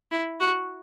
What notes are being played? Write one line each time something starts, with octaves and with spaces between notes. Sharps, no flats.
E4
F#4